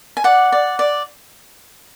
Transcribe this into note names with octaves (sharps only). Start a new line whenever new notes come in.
G#5
D5 F#5
D5
D5